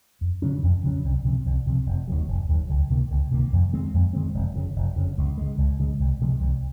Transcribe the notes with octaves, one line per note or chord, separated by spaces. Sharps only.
F2
C#3 F#3 C#4
F2
C#3 F#3 C#4
C2
C3 F3 C4
C2
C3 F3 C4
F1
D#2 D#3 F#3
F1
D#2 D#3 F#3
C#2
C3 D#3 A#3
C#2
C3 D#3 A#3
F2
D#3 G#3 C4
F2
D#3 G#3 C4
F1
F2 C#3
F1
F2 C#3
C#2
C#3 G#3
C#2
C#3 G#3
C2
C3 F3 G#3
C2